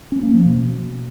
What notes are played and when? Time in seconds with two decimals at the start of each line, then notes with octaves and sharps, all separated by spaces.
0.12 C#4
0.23 A#3
0.34 F3
0.46 B2